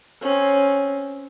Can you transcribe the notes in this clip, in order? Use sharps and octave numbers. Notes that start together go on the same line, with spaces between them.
C4 C#4